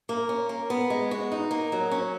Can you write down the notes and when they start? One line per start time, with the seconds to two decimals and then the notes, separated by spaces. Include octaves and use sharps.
0.09 A#3
0.29 C#4
0.49 A#3
0.70 B3
0.90 G#3
1.11 F#4
1.32 D#4
1.51 A#3
1.72 F#3
1.91 C#4